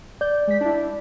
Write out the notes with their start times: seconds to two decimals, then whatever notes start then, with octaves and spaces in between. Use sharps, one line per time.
0.21 D5 G6
0.48 G#3 B6
0.61 D4 E4